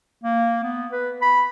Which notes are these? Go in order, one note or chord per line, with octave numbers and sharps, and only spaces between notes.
A#3
B3
B4
B5